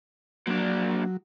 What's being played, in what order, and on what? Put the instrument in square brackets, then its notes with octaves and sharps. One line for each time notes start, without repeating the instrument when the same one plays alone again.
[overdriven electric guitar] A#2 D4 [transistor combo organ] F#3